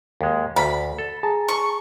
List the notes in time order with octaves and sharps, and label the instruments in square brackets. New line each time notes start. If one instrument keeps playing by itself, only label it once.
[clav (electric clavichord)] D#2 G#3
[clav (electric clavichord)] D2 [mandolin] B5
[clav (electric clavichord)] A4
[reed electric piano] G#4 A5 A#5
[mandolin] C#6